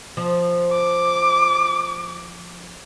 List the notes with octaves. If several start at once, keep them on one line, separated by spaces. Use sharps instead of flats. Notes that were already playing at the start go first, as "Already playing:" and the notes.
F3
D6